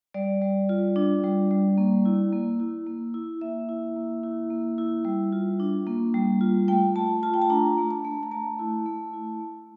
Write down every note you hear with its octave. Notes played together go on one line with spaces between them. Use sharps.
G3 D5
G3
F4
D4
G3
G3
A#3
E4
A#3
E4
A#3
E4
A#3 E5
E4
A#3
E4
A#3
E4
G3
F4
D4
A#3
G3
F4
A3 G5
A3 A5
F4 A5
G5
A5
D4 A#5
A3
A5
A3
A#5
A3 A5
E4
A3
E4
A3